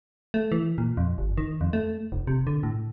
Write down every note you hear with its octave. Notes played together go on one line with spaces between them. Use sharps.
A3
E3
A#2
F2
G1
D#3
F2
A3
F1
C3
D3
A2